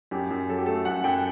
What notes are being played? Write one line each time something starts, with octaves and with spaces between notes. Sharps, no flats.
F#2 G4
F#2
F#3 A4
G4
A3 A4
F#2 F#5
F#2 G5